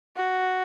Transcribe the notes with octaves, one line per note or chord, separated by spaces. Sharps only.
F#4